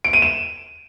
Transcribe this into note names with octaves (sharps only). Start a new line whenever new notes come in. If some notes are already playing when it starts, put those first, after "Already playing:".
D7
D#7
E7